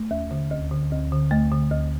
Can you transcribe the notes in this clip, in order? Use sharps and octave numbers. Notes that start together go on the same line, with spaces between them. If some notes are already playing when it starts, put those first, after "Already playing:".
Already playing: A3
D#2
D3
D2
D3
D2
D3
D2 A3
D3
D2